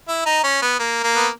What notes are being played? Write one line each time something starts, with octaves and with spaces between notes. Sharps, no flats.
E4
D#4
C#4
B3
A#3
A#3
B3